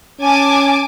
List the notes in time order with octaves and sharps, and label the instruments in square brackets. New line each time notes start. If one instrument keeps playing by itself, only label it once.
[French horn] C#4 [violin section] G#5 A5 D6